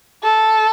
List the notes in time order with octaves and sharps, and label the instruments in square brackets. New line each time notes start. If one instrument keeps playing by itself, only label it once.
[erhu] A4